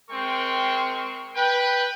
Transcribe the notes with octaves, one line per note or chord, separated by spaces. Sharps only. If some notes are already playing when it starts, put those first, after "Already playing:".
G#3 C4 A#4 G5 C6 C#6
B4 G5